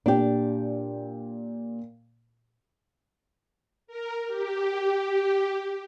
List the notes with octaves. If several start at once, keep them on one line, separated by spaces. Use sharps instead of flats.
A#2 D4 G4 G5
A#4
G4